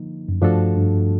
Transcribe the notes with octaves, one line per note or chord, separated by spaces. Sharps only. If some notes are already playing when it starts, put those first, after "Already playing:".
Already playing: D3 F3 A#3 D#4
F#2
G2 F3 A3 D4 F#4 A4
G2